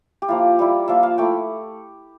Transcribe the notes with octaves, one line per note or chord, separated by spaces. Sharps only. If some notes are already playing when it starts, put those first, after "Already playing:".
G4
F3 A#3 E4 F4
G3 A#3 E4
F3 A#3 F4 E5
F5
A3 E4 G5